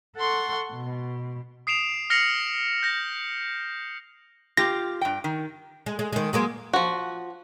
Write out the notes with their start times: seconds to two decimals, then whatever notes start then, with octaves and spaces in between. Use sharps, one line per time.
0.17 A4 F#5 C6 C#6
0.71 B2
1.67 D#6 C7 D7 E7 F7
2.10 F6 A#6 C7 C#7 F7 F#7
2.83 G6 A#6
4.57 F4 G4 A#6
5.01 G2 G5
5.24 D#3
5.86 G#3
5.99 G#3
6.13 D#3 G#3
6.33 F#3 G#3 A#3
6.73 F3 F#4